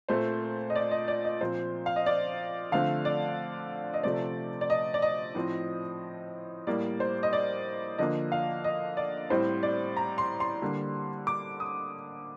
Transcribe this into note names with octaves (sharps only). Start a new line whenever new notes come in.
A#2 A3 C4 C5
D#5
D5
D#5
D5
D#5
A#2 F3 C4 C5
F5
D#5
D5
D3 F3 A3 C4 F5
D5
D#5
C3 F3 A3 C4 D5
D5
D#5
D5
D#5
A2 F3 C4
A2 G3 A#3 D5
C5
D#5
D5
D3 F3 A#3 D#5
F5
D#5
D5
A2 G3 C4 C5
D5
A#5
C6
C6
D3 G3 A#3
D6
D#6